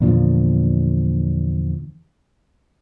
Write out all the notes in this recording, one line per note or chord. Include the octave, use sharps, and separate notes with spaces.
E2 A#2 D3 F3